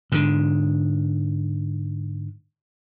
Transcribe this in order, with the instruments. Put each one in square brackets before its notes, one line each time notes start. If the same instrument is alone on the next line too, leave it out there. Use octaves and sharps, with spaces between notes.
[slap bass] G#2 D3